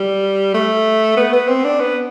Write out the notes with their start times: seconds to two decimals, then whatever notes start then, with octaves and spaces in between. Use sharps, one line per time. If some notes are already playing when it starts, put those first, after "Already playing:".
Already playing: G3
0.54 A3
1.17 B3
1.33 B3
1.49 C4
1.64 D4
1.80 B3